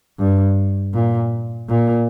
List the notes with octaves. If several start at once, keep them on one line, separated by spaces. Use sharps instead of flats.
G2
A#2
A#2